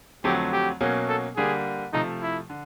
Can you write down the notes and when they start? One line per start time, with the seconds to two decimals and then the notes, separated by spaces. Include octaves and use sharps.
0.24 F2 D3 F#3 A3 C4 G4
0.53 G4
0.81 B2 F#3 A#3 C#4
1.08 A4
1.36 D3 G3 A#3 G#4
1.93 C3 F3 A3 D#4
2.21 E4
2.50 D3